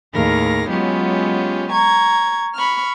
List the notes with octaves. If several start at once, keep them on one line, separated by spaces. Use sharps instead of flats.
D#2 A2 G#4 A#4 F5 A#6
F#3 G#3 B3 C#4 F4 G4
A#5 C#6 G#6
B5 C#6 F6